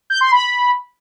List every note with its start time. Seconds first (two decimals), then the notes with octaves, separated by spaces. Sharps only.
0.10 G6
0.21 C6
0.31 B5